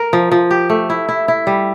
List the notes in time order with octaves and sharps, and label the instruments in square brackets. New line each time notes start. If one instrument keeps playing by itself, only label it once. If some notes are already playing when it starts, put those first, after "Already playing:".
Already playing: [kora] A#4
F3
F3
G4
A3
E4
E4
E4
G3